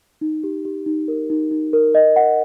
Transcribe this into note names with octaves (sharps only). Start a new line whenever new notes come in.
D#4
G4
G4
D#4
A#4
D#4
D#4
A#4
D#5
F#5